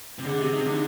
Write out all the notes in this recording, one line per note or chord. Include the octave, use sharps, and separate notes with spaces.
C3
D3 G#4
C3 G4
C3 D#4
D3 D4